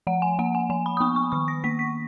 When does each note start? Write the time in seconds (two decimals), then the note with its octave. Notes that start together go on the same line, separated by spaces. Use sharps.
0.07 F3 F#5
0.22 G#5
0.39 A#3 F#5
0.55 G#5
0.70 F3 G#5
0.86 B5
0.97 D#6
1.00 B3 C#6
1.16 C#6
1.32 D#3 C#6
1.48 A#6
1.64 A#3 B6
1.79 B6